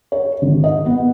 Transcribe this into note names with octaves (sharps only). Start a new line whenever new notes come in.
C#5
G#1
D#5
B3